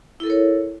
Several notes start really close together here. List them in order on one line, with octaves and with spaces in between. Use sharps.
E4 A4 A#4 C#5